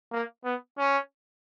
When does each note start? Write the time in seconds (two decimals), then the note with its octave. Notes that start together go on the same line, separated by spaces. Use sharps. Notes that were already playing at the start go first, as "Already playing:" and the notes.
0.12 A#3
0.44 B3
0.78 C#4